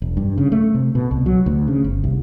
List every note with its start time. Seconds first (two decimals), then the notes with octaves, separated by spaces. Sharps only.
0.02 E1
0.17 G2
0.38 C#3
0.52 A3
0.75 C3
0.95 B2
1.11 C2
1.26 F#3
1.46 D2
1.68 C#3
1.84 G1
2.04 C2